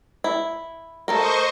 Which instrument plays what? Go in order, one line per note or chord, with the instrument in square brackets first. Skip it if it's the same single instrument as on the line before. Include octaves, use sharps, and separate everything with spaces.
[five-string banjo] E4
[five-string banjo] A3 A4 A#4 [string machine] C5 D#5 C#6